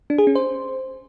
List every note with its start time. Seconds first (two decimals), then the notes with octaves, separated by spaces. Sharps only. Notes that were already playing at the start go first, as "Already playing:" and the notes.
0.10 D4
0.18 G#4
0.27 C#4
0.35 C5